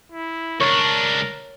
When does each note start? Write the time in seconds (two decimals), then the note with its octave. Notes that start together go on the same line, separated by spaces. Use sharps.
0.12 E4
0.60 C#2 D4 A#4 C#5